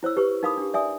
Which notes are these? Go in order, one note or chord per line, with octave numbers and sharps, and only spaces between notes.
E4 C5 C#5 E6
G4 B4 C#6
D#4 A#4 F5 B5 D6 D#6
D4 G4
D5 E5 G#5 D#6